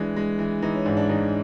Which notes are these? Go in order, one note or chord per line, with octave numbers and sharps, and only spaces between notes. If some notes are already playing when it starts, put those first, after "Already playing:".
Already playing: E3 G#3 D4
G#3
E3
E3 D#4
C#4
G#2 D4
D4
E3 D#4